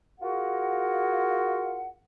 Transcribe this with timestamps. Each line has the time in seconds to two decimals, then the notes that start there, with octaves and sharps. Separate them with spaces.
0.20 F4 F#4 G#4 A#4 F#5